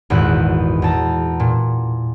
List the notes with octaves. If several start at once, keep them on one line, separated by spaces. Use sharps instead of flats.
G#1 E2 A#2 E4 F#4 F#6
E2 A5 A#5
A#2